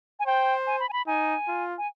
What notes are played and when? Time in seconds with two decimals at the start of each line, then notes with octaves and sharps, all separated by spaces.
0.20 G#5
0.26 C5 G5
0.67 G#5
0.80 B5
0.89 G#5
0.93 B5
1.07 D#4 G#5
1.48 F4
1.78 G#5